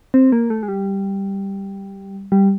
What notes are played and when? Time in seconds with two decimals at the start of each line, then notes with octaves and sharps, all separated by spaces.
0.14 C4
0.32 A#3
0.50 A3
0.63 G#3
0.68 G3
2.32 G3